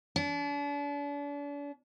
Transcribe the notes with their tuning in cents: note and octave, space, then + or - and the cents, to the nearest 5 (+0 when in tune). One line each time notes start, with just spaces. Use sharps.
D4 -40